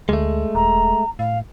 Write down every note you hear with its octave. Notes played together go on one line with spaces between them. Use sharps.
D2 G#3 A3
D#1 A#5
A2 F5